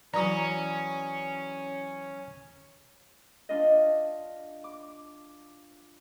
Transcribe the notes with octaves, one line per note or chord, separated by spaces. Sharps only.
E3 F#3 C#4 D5 A#5 D#6
D4 F4 D#5
D6